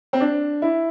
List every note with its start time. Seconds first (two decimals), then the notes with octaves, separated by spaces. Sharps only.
0.13 C4
0.21 D4
0.62 E4